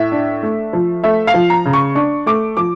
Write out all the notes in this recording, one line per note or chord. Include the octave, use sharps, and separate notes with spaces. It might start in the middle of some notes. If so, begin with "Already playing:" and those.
Already playing: A2 E5
D4
A3
F3
A3 E5
F5
F3
A#5
C#3
C#6
D4 C#6
A3 D6
F3 D6